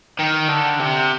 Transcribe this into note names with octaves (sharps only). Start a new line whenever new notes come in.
D#3
D3
C3